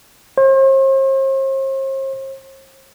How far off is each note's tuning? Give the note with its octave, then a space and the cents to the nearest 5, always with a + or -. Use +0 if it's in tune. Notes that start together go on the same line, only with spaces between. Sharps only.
C5 +45